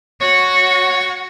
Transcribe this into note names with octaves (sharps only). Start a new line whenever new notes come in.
F#4 C#5 F#5